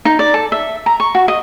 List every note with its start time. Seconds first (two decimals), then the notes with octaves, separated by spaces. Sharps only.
0.05 D#4
0.19 D5
0.34 A4
0.52 E5
0.86 A#5
1.00 C#6
1.15 F#4
1.28 D#5